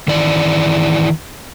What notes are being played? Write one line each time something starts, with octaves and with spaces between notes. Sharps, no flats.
D#3 E3 D5